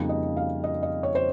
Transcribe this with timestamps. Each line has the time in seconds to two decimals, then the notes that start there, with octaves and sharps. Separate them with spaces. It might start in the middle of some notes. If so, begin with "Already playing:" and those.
Already playing: F2 C#3 G3 A#3 D#4
0.09 D#5
0.37 F5
0.64 D#5
0.83 D#5
1.03 C#5
1.15 C5